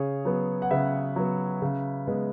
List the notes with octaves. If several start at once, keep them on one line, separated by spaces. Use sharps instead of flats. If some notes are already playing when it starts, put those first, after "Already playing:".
Already playing: C#3 G#4 C#5
F#3 B3
F#5
C#3 B4 E5
F#3 B3
C#3
G#3 B3